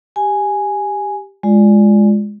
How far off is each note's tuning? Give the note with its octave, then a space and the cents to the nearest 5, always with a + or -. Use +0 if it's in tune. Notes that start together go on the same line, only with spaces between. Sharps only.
G4 +0 G#5 +0
G#3 +0 F4 +0 D5 +0